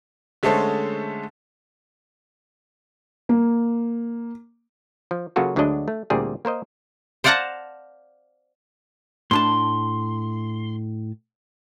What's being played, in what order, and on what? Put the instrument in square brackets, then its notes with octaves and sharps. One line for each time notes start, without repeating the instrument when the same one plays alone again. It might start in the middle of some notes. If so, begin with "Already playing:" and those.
[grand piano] D3 G#3 A3 C#4 A4 C5
[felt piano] A#3
[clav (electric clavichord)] F3
C#3 F#3 A#3 F4 F#4 A4
D2 D3 F#3 G#3 D4 D#5
A3
D2 A#2 G3 C4 G#4
A#3 A#4 C5 D#5
[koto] C5 D5 F5 F#5 A5 A#5
[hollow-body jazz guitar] A2 D4 A5 [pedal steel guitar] C6